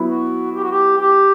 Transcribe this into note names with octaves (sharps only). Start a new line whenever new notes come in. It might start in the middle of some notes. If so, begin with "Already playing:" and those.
Already playing: F#3 B3 E4
F#4
G4
F#4
G4
G4